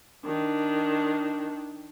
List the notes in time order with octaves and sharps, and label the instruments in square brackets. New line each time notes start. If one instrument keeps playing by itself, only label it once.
[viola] D#3 D4